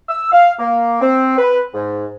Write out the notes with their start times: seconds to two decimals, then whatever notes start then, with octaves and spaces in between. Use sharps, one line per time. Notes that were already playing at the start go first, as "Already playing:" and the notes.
0.09 E6
0.32 F5
0.59 A#3
1.01 C4
1.38 B4
1.74 G#2